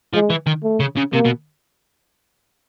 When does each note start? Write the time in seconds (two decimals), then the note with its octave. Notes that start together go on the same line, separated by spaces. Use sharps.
0.14 F3 G#3
0.30 E3
0.47 D#3
0.63 A3
0.80 C#3
0.97 C#3
1.13 C3 A#3
1.25 B2